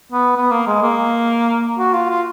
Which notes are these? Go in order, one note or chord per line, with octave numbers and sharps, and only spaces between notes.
B3
B3
A#3
G#3
A#3
F#4
F4
F4